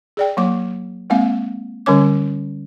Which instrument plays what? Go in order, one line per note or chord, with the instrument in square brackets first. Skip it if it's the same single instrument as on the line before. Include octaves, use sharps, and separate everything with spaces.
[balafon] G#4 D5 G5
F#3 A#3 D6
G#3 A#3 C4 F5
D3 G3 C#4 C#5 D6